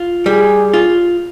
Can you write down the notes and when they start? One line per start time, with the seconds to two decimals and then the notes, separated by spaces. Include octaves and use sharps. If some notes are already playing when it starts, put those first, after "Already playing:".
Already playing: F4
0.26 G3 G#4
0.74 F4